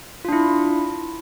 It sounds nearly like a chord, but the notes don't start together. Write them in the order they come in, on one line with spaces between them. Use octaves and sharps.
F4 D4 E4